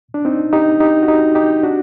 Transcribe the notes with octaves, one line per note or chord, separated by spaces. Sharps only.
D4
C4 D#4
D#4 G4
D#4 G4
F#4
D#4 G4
D#4 G4
D4 F#4